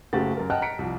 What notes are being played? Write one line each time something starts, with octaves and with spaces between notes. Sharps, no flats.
F#1 C#3 A3 F#4 G4 A6
F#2 A#4
D#5 F#5 G5 A5 F6 F#6
A#5 B6 C#7 D7
C2 F3